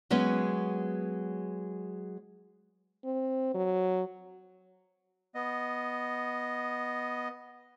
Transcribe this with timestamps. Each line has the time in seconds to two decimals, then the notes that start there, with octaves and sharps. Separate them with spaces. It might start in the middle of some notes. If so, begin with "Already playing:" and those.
0.10 F#3 G#3 B3 C#4
3.05 C4
3.54 F#3
5.35 B3 D#5